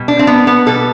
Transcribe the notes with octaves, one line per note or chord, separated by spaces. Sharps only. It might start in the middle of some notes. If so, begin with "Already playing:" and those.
Already playing: B2 G3
D4
C4
B3
B3
B2 G3 A4